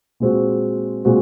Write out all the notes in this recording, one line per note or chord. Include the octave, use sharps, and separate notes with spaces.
A#2 G#3 C4 F#4
A#2 G#3 C4 F#4